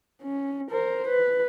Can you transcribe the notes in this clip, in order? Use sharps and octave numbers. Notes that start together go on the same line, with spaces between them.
C#4
A#4 C5
B4